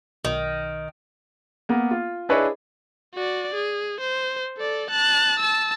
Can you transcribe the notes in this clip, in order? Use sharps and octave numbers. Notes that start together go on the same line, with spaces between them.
B1 D#3
A#3 B3
F4
D4 E4 G#4 B4 C#5 D#5
F#4 D5
G#4
C5
A4 D5
A5 F#6
A5 E6